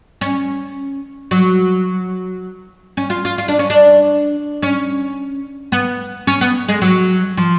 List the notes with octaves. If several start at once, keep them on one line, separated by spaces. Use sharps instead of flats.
C#4
F#3
C#4
F4
F4
F4
D4
C#4
D4
C#4
B3
C#4
B3
G#3
F#3
F3